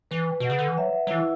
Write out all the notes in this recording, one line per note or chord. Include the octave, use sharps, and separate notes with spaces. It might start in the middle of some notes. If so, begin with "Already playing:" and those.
E3 B4
B2 F#5
C#3
D3
E3
F#3 E5
F#3
E3 E4